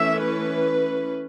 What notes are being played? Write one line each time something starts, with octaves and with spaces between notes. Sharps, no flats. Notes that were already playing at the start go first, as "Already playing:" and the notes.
Already playing: E3 A3 C#4 E5
B4